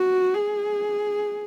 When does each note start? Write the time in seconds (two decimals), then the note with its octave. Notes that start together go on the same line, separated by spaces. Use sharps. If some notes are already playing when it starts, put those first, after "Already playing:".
Already playing: F#4
0.34 G#4